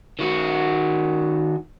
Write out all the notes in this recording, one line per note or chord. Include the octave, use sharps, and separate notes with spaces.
D#3 F#4